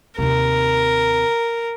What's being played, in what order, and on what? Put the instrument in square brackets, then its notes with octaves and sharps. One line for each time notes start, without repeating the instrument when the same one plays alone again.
[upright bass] D#2 C3 [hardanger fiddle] A#4